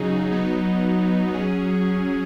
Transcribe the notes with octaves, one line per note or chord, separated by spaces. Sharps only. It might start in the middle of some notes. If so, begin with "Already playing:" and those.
Already playing: C#3 F#3 D#4 G#4
F#3 B3 D#4
F#3 C#4 G#4